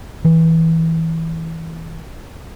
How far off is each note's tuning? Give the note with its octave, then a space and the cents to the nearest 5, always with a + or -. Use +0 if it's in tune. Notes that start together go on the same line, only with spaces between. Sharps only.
E3 -20